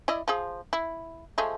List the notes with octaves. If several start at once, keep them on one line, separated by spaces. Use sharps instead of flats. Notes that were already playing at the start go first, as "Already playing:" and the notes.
E4 D5 D#5
F3 G#4
E4
F3 G#3 A3